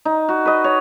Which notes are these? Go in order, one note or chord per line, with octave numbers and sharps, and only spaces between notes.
D#4
F#4
B4 D#5
C#5